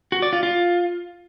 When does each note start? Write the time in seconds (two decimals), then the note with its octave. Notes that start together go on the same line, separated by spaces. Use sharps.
0.12 F#4
0.22 D5
0.33 F4
0.43 F4